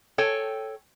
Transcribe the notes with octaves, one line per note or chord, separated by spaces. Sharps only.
A4 C#5 G5 G#5